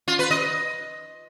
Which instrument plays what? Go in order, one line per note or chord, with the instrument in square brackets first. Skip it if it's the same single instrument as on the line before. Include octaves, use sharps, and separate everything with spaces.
[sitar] F4
B4
D#5